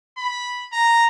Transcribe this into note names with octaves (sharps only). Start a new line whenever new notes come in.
B5
A#5